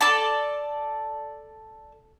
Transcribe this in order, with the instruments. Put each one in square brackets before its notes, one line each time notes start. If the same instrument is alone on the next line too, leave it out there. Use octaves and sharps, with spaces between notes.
[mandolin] A4 D5 A5